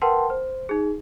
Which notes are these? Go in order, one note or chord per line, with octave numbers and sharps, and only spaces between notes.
A#4 B4 F#5 G5 A5 C6
C5
D#4 G#4